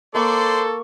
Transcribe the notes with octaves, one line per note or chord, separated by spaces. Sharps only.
A#3 A4 C5 D5 C6 C#6